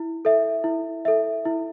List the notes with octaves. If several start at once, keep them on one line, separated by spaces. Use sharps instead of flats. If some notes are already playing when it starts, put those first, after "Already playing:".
Already playing: E4
A4 E5
E4
A4 E5
E4